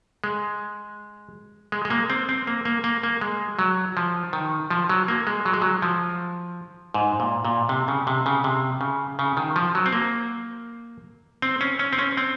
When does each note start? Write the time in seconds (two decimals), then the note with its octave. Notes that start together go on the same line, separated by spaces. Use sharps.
0.24 G#3
1.72 G#3
1.85 G#3
1.90 A#3
2.10 C4
2.29 C4
2.47 A#3
2.65 A#3
2.84 A#3
3.03 A#3
3.21 G#3
3.59 F#3
3.97 F3
4.33 D#3
4.70 F3
4.89 F#3
5.08 A#3
5.27 G#3
5.45 F#3
5.54 G#3
5.62 F#3
5.82 F3
6.94 G#2
7.20 A#2
7.45 A#2
7.69 C3
7.88 C#3
8.07 C3
8.26 C#3
8.44 C3
8.81 C#3
9.19 C#3
9.37 D#3
9.56 F3
9.75 F#3
9.86 C4
9.93 A#3
11.42 C4
11.61 C#4
11.79 C#4
11.93 C4
11.98 C#4
12.17 C4